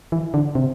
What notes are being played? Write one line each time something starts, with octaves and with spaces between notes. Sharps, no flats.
E3
D3
C3